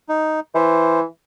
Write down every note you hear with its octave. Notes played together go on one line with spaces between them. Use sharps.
D#4
E3 C5